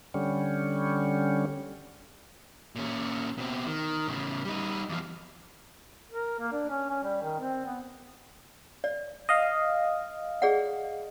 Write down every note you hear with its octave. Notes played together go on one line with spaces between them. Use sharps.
D3 G3 C#4
A#2 C#4
B2 C4
D#3
A2 C#3
G3 D#4
E2 F3
A#4
A#3
D4
C#4
C#4
G3
D#3
C4
B3
D5
D#5 F5
G#4 D5 F#5